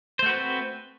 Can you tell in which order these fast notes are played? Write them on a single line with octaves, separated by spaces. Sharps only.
C5 A3 F#4 B4 C4